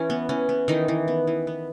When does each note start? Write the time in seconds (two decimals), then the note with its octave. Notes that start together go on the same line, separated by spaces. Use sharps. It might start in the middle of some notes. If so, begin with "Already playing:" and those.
Already playing: E3 C#4
0.10 B3
0.29 E3 C#4
0.49 B3
0.68 D#3 E3 D#4
0.88 E3
1.08 B3
1.27 E3
1.47 B3